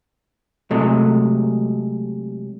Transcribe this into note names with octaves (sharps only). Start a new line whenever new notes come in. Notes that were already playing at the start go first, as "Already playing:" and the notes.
C3 F#3 G#3 A3